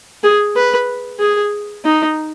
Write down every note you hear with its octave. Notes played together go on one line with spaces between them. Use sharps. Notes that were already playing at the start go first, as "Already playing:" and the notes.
G#4
B4
G#4
D#4